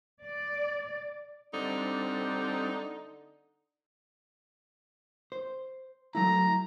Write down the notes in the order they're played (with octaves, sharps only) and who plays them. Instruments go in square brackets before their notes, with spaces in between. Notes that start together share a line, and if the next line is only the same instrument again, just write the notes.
[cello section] D5
[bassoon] D3 [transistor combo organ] G3 C4 D4 [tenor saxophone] D#4
[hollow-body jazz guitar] C5
[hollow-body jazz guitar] F#3 A3 E4 [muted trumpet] A#5